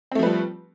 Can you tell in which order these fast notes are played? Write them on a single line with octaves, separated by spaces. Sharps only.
C4 A3 F3 B4 G3